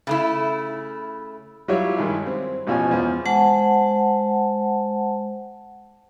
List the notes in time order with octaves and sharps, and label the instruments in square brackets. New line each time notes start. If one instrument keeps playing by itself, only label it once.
[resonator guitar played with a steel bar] C#3 A3 E4
[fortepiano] F#3 G3 E4 F4 G4 C#5
G2 D#3 G#3 E4
C4
A1 B2 F3 C#4 G#5
E2 F3
[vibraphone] G#3 C5 F#5 A5